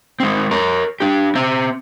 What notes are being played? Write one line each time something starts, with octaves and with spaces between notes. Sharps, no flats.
G#3 C4
A#4 C#5
D4 G4
C4 E5